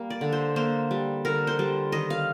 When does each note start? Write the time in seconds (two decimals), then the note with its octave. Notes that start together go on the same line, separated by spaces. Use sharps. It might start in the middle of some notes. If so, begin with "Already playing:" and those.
Already playing: G3 A#3
0.10 D5
0.21 D3
0.32 C5
0.56 A#3 C5
0.91 G3
1.25 D3 A#4
1.47 C5
1.59 G3
1.92 D#3 D#5
2.10 F5